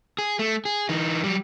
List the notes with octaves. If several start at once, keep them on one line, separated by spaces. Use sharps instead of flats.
G#4
A3
G#4
E3 D#4
F#3 G3